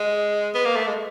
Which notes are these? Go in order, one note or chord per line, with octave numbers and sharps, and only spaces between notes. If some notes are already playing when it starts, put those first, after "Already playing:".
Already playing: G#3
B3
A#3
A3
G#3